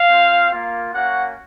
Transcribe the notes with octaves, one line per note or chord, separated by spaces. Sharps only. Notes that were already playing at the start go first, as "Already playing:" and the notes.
Already playing: F5
C4 F4
A#3 F4
A#3 C#4 F#4 F#5